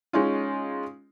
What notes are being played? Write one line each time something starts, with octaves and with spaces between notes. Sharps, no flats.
G#3 C#4 D#4 F4